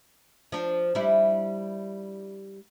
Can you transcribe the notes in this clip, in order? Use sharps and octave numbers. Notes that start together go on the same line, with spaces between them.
F3 D4
G3 D4 E4